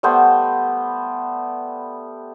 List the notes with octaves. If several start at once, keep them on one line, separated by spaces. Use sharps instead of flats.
G3 A3 B3 C5